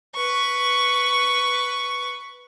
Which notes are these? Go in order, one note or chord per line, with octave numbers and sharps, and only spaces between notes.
B4 C#6